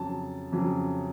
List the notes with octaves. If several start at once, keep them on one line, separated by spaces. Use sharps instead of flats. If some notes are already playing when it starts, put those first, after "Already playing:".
Already playing: F2 C#3 F#3 A5
F2 C#3 F#3